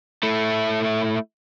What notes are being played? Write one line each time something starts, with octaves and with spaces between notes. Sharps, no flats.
A3 E4